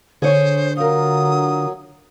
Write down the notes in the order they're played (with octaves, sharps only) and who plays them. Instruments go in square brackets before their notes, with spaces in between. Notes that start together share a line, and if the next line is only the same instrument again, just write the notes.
[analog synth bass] D3 [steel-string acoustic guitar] G#4 C#5 [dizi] C5
[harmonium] F#3 [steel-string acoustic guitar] F4 A#4 [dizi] D#6